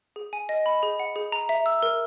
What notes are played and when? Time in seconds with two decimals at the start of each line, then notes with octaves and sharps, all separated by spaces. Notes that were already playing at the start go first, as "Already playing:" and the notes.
0.16 G#4
0.33 G#5
0.49 D#5
0.66 B5
0.83 G#4
1.00 F#5
1.16 G#4
1.32 A#5
1.49 E5
1.66 E6
1.83 A#4